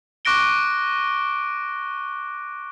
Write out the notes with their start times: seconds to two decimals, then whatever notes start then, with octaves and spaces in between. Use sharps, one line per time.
0.25 C#6 D6 F#6 A#6 D7 G7